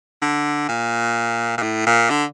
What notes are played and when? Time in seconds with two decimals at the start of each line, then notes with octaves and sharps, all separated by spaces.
0.22 D3
0.69 A#2
1.58 A#2
1.62 A2
1.87 A#2
2.10 D3